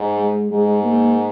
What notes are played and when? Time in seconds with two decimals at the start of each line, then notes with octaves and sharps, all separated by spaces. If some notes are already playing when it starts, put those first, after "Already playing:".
Already playing: G#2
0.17 G#3
0.51 G#2 G#3
0.83 A#3